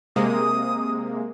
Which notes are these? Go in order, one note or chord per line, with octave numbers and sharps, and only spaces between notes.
C3 G#3 A#3 D#6